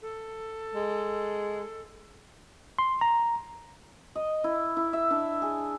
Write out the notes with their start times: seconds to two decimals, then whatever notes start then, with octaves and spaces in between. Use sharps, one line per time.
0.02 A4
0.74 G#3
2.79 C6
3.01 A#5
4.15 D#5
4.44 E4
4.77 E4
4.93 E5
5.10 D4
5.42 G#4